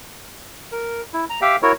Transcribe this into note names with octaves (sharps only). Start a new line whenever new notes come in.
A#4
E4
A#5
G4 E5 F5 G5
E4 F#4 A#4 C#5